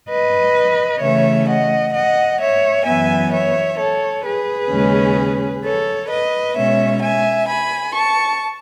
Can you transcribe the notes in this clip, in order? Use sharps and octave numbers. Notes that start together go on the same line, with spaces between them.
B4 D#5
C#3 E3 A3 C#4 C#5 E5
D#5 F#5
D#5 F#5
C#5 E5
F#2 E3 B3 E5 G#5
C#5 E5
A4 C#5
G#4 B4
D#2 C#3 G#3 C#4
A4 C#5
B4 D#5
B2 G#3 C#4 C#5 E5
E5 G#5
G#5 B5
A5 C#6